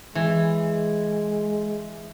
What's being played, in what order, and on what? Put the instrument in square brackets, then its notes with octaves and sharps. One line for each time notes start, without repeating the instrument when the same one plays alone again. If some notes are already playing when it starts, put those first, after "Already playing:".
[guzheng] E3 [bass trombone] G#3